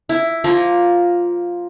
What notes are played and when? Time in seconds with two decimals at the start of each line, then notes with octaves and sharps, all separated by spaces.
0.09 E4
0.44 F3 A#3